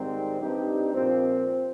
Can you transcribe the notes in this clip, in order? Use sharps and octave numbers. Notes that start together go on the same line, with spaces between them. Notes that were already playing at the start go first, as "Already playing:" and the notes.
Already playing: G#2 D#3 G3 C4 D#4
G2 G3 C4 D#4 G4
A#2 F3 C4